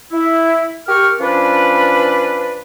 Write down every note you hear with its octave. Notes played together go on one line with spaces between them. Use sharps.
E4
G4 A#4 C#6 F6
F3 C#4 D4 B4